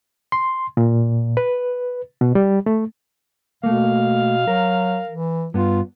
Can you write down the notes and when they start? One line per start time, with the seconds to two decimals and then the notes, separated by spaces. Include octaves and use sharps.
0.32 C6
0.77 A#2
1.37 B4
2.21 B2
2.35 G3
2.66 A3
3.64 B2 A3 A#3 F5
4.47 F#3 A#4
5.09 E3
5.54 G2 B3 F4